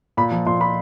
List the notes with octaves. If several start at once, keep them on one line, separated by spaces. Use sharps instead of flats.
A#2 B5
F3
A#2 C6
F3 B5